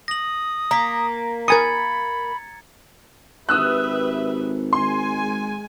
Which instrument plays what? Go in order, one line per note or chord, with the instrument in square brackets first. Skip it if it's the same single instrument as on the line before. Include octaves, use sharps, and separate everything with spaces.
[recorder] D#6 [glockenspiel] A#6 F#7
[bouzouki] A#3 [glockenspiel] A#5 B6
[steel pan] A#4 G#5 D#6 [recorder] B5 [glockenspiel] G#6 A6 C#7
[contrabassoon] G#1 [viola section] G4 B4 E5 [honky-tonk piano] D#6 E6 F#6
[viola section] G#3 G#5 [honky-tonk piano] C6